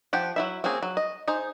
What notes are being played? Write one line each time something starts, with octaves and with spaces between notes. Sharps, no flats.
F3 G4 F#5
F#3 E4 E5
A#3 C4 C#4 F#4 G#4
F#3
D#5
D#4 G#4 C5